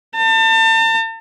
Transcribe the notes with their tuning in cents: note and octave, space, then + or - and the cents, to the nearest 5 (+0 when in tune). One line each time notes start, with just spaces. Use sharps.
A5 +40